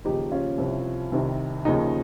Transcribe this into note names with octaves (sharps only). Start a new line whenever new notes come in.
D#2 C#3 F3 D#4 G4
C#4 F4
C2 C3 F3
C2 C3 D#3
D#2 C#3 F3 D#4